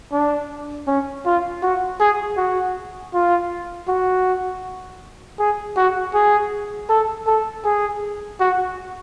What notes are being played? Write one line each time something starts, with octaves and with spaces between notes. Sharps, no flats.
D4
C#4
F4
F#4
G#4
F#4
F4
F#4
G#4
F#4
G#4
A4
A4
G#4
F#4